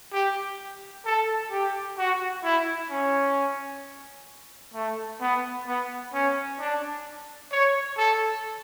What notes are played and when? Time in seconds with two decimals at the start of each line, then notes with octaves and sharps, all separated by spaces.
0.13 G4
1.05 A4
1.51 G4
1.98 F#4
2.43 E4
2.90 C#4
4.74 A3
5.21 B3
5.67 B3
6.14 C#4
6.60 D4
7.52 C#5
7.97 A4